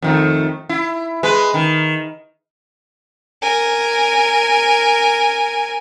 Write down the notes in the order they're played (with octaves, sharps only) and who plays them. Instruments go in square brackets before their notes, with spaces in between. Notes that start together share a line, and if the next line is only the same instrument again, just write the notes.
[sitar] F2 D#3 A3
E4
G#3 B4
D#3
[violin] A#4 G#5